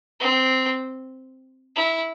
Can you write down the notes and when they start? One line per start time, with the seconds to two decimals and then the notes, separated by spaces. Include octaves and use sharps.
0.20 C4
1.76 E4